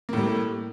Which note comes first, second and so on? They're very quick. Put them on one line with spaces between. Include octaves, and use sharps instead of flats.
A#3 A2 G3